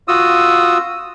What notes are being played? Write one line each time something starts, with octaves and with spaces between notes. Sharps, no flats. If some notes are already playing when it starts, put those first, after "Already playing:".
F4 F#4 D#6 E6